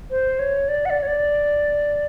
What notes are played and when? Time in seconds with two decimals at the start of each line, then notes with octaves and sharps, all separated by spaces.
0.11 C5
0.39 C#5
0.68 D5
0.85 F#5
0.90 D5
1.02 C#5
1.07 D5